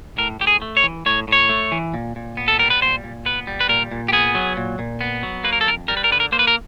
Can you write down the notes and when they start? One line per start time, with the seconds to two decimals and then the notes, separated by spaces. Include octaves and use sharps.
0.18 A2 A#4
0.40 A2 G4
0.47 G#4
0.62 A3
0.77 C#5
0.83 E3
1.06 A2 C#5
1.28 A2 C#5
1.49 A3
1.72 E3
1.94 A#2
2.16 A#2
2.37 B3
2.48 A4
2.59 G3 A#4
2.70 B4
2.82 A#2 C5
3.04 A#2
3.25 B3 B4
3.47 G3
3.61 B4
3.69 A#2 A#4
3.91 A#2
4.08 G4
4.13 B3 G#4
4.35 F#3
4.57 A#2
4.79 A#2
5.01 B3
5.23 F#3
5.44 A#3 B4
5.53 A#4
5.61 A4
5.66 F2 A#4
5.88 G3 A#4
5.97 B4
6.04 A#4
6.11 D3 B4
6.20 A#4
6.32 A#3 C5
6.39 B4
6.47 A#4